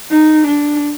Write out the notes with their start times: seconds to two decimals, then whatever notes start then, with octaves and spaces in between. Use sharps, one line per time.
0.11 D#4
0.47 D4